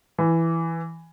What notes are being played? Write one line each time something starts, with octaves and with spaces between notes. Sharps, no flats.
E3